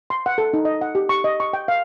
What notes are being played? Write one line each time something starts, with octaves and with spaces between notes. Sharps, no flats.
C6
F#5
A4
D#4
D#5
F#5
G4
C#6
D#5
C#6
G5
F5